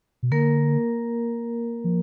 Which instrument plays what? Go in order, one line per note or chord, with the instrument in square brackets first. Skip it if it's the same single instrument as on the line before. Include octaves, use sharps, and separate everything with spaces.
[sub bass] B2
[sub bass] D3 [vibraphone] A#3 A#4
[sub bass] F3